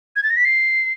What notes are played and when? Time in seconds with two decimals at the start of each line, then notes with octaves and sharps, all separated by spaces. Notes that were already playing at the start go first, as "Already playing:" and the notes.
0.16 G#6
0.23 A6
0.30 A#6
0.37 B6
0.45 C7